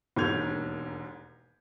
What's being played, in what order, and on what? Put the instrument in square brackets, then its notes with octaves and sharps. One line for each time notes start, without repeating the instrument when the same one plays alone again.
[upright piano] E1 D#2 G#2 G6 G#6 F7